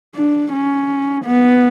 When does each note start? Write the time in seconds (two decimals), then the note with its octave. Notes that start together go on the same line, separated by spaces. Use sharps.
0.15 D4
0.52 C#4
1.25 B3